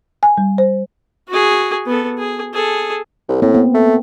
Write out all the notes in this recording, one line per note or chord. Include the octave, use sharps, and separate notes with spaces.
G#5
G3
C5
F#4 G#4
B3 A4
G#4
G#4 A4
C2
A2 A#3 C4
B3
A3